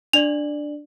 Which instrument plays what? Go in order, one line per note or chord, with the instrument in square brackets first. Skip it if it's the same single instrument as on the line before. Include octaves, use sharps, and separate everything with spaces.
[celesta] D4 D5 F#7 [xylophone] F7